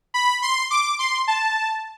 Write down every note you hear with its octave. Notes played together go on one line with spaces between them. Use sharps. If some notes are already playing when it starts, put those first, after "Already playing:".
B5
C6
D6
C6
A5